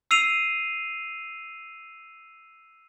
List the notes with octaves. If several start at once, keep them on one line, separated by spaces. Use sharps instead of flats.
E6 C7 D#7 F7